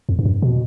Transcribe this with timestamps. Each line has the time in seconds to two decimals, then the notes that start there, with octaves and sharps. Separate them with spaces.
0.09 F2
0.19 G2
0.25 F#2
0.42 B2